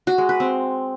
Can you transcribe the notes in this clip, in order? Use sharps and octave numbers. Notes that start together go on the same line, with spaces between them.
F#4
G#3
B4
C4